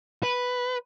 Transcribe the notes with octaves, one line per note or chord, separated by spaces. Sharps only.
B4